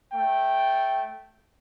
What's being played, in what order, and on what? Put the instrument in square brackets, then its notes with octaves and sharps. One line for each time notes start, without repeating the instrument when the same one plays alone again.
[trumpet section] A3 G5